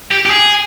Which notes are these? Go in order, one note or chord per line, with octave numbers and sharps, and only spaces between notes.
G4
G4
G#4